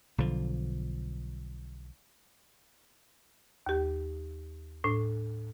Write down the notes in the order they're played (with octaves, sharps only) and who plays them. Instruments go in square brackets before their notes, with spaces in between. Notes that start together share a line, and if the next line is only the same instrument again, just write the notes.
[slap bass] B1 D3 F3
[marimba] D#2 G4
A2 D4